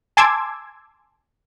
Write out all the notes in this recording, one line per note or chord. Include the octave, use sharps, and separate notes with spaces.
G#5 A5 C6 D6 E6 G#6